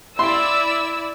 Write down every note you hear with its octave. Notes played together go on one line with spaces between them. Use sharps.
E4 D5 C6 E6